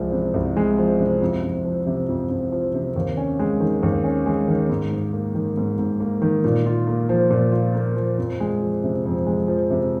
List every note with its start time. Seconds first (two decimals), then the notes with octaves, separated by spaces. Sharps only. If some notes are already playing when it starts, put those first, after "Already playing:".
Already playing: C2 F3 G#3
0.12 C3
0.34 C2
0.57 G#3
0.78 F3
1.00 C3
1.22 F2
1.43 F2
1.65 F3
1.87 C3
2.09 F2
2.30 F2
2.52 F3
2.74 C3
2.96 D#2
3.17 C#4
3.39 G#3
3.60 D#3
3.83 D#2
4.04 C#4
4.26 G#3
4.48 D#3
4.70 G#2
4.92 G#2
5.13 A#3
5.35 D#3
5.57 G#2
5.79 G#2
6.00 A#3
6.22 D#3
6.44 A#2
6.66 F4
6.87 A#3
7.09 F3
7.30 A#2
7.52 F4
7.75 A#3
7.96 F3
8.18 F2
8.40 G#3
8.62 F3
8.84 C3
9.06 F2
9.27 G#3
9.48 F3
9.71 C3